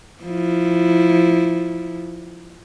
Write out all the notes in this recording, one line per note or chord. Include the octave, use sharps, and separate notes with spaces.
F3 E4